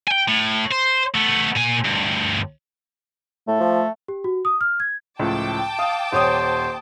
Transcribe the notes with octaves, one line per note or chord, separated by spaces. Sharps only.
G5 G#5
A2
C5
A3 B3
A#2 G#5
D2 G2
A2 A3
F3
G4
F#4
D#6
F6
G#6
C#2 A2 F3 G5 A5 D6
F5 D#6
D#1 C5 C#5 D#6